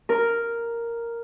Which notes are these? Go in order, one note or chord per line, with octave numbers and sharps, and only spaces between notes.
A#4